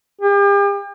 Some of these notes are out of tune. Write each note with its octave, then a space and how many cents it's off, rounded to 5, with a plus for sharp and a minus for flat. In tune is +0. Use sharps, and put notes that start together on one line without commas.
G4 +40